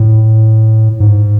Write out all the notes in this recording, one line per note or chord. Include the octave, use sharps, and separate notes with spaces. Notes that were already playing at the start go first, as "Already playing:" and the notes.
Already playing: A2
G#2